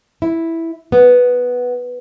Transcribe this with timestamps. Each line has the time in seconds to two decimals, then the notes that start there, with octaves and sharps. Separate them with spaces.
0.22 E4
0.92 B3